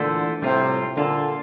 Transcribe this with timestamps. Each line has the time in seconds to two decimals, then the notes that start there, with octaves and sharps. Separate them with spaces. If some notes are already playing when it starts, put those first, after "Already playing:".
Already playing: A#2 D3 E3 A3 E4 A4 C5
0.42 A2 C3 G3 C4 F4 C5
0.97 A#2 D3 A#3 F4 A4